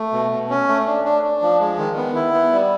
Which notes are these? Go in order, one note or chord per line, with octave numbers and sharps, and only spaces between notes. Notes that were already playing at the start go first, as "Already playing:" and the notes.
Already playing: A3
B2
B2
C#4
A3
D4
D4
D4
F3
G#3
D#3
B3
E4
B3
G3